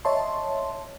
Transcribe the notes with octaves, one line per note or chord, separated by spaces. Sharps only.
C#5 D#5 E5 A5 C6